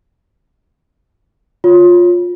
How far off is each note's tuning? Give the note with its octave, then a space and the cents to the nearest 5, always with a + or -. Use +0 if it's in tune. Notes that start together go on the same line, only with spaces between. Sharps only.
F4 +15 C#5 +0